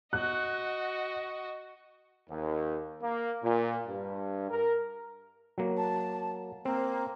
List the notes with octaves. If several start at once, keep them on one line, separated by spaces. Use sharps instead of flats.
F#4 D#5 F#6
D#2
A#3
A#2
G2
A#4
F#3 A#3
A5
A#3 C4